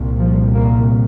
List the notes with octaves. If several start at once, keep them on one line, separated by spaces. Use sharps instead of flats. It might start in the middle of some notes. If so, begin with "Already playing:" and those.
Already playing: C2 A#2
F3
A#3